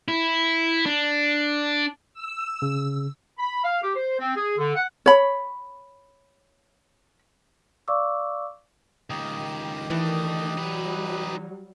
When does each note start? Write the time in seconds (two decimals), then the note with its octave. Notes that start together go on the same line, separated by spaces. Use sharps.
0.08 E4
0.86 D4
2.13 E6
2.62 C#3
3.38 B5
3.64 F5
3.82 G4
3.95 C5
4.19 C4
4.36 G#4
4.58 D3
4.75 F#5
5.06 C#5 B5
7.88 D5 F5 C#6 D6 E6
9.10 C#2 D#3 G4 D#5 D#6
9.90 D#3 E3 A3 D4
10.57 F#3 G3 D#4 B4